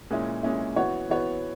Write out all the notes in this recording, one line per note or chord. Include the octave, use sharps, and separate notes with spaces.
A#2 G#3 C#4 E4
A#2 G#3 C#4 E4
E3 B3 F#4 C#5
E3 B3 F#4 C#5